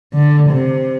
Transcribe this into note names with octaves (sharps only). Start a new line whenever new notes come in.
D3
C3